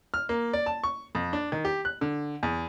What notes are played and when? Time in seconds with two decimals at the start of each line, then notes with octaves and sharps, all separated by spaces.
0.14 F6
0.29 A#3
0.53 D5
0.66 A5
0.84 C#6
1.15 F2
1.33 D4
1.52 D#3
1.65 G4
1.85 F#6
2.01 D3
2.43 E2